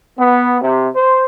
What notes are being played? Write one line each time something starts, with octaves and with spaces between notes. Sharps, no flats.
B3
C3
C5